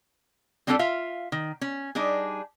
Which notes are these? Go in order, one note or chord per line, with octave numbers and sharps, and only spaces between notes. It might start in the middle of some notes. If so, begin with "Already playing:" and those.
G3 C4 D4 F4 G#4 A4
F4 E5 F5
D#3
C#4
G3 D4 D#4 G#4